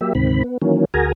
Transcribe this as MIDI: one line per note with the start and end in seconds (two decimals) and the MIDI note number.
0.01 0.13 54
0.01 0.13 58
0.01 0.13 67
0.01 0.13 76
0.15 0.43 38
0.15 0.43 44
0.15 0.43 48
0.15 0.43 51
0.15 0.43 60
0.15 0.43 83
0.44 0.58 59
0.62 0.85 51
0.62 0.85 52
0.62 0.85 54
0.62 0.85 58
0.62 0.85 61
0.94 1.12 38
0.94 1.12 66
0.94 1.12 68
0.94 1.12 70
0.94 1.12 80
0.94 1.12 82